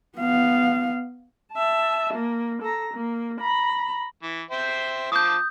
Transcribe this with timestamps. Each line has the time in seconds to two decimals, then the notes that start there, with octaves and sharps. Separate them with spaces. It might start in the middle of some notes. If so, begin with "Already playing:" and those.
0.17 B3 F5
1.52 E5 A5
2.14 A#3
2.62 A4 A#5
2.94 A#3
3.41 A#5 B5
4.23 E3
4.51 C5 E5 G5
5.12 F3 A5 D6 D#6 G6